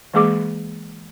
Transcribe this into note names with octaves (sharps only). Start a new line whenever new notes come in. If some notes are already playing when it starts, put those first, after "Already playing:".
E3 G#3 A#3 G#4 D6